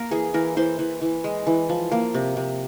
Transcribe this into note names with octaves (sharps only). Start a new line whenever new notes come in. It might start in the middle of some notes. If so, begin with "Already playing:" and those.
Already playing: A#3 A#4
E3 G#4
E3 A#4
E3 C5
E3
E3
G#3
E3
F3
A#3
C3
C3